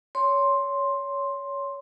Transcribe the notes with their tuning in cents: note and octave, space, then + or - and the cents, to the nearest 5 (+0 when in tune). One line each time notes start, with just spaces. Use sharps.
C#5 +20 C6 +10